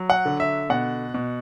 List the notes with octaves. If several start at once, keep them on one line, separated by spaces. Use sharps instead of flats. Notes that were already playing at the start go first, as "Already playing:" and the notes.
Already playing: F#3
F#5
D3
E5
B2 F#5
B2